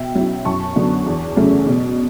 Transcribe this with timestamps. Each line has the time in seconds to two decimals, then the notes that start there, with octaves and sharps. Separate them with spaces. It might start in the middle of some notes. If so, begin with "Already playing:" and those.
Already playing: B2 E5 G5
0.15 F#3 C#4 E4
0.45 F#2 A5 C#6
0.76 D3 F#3 B3 D4
1.06 E2
1.36 C#3 F#3 A3 C#4
1.67 B2